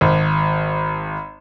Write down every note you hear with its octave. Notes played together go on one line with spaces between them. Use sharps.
G#1